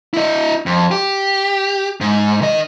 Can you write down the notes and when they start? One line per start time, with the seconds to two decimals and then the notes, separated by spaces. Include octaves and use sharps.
0.14 E4 D#5
0.66 F2
0.91 G4
2.01 G#2
2.42 D#3 D#5